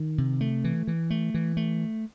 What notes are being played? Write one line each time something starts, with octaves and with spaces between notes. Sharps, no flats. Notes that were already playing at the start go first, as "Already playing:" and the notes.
Already playing: D#3
C3
A3
E3
E3
A3
E3
A3